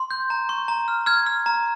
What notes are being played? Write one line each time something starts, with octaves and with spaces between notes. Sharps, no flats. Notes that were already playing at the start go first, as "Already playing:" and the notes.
Already playing: C6
G6
A#5
C#6
A#5
F6
F6 G#6
F6
A#5